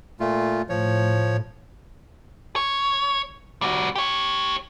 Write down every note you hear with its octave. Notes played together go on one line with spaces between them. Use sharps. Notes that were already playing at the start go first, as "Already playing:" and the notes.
A#2 A3 F4
A2 F3 C#5
C#5
G3 F#4
G4 C#5